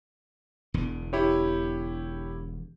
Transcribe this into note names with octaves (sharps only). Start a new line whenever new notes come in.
E1 E2 D3
E4 G4 C#5